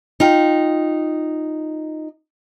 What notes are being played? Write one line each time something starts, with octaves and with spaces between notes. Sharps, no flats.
D#4 F4 G5